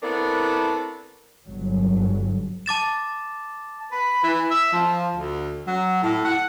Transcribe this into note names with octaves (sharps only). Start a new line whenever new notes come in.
A3 B3 C4 D4 E4 A#4
G1 F#3
A5 D6 A6 E7
B4
E3
E5
F3
D2
F#3
A2
F#5